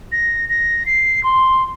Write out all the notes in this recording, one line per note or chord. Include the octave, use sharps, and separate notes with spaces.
A#6
A#6
C7
C6